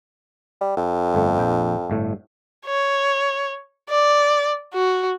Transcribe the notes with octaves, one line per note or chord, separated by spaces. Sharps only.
G3
F2
G1 A3
A#1 G5
G1 A2 A3
C#5
D5
F#4